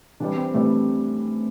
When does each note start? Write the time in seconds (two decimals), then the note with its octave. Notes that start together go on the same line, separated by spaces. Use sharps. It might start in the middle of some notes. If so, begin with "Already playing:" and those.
0.20 C3 E3 G3 D4
0.37 C4
0.54 C3 E3 G3 A3